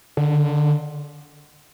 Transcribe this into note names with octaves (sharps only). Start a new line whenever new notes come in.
D3